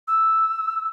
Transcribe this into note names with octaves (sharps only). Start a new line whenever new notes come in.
E6